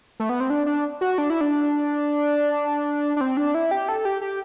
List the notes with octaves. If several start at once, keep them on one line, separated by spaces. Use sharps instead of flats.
A3
B3
C4
D4
D4
F#4
D4
E4
D4
D4
C4
D4
E4
G4
A4
G4
G4